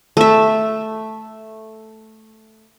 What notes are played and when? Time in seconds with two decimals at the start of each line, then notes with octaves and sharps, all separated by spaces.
0.17 A3 E5